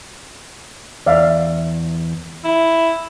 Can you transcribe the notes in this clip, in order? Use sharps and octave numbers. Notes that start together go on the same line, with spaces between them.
E2 D5 E5 F5
E4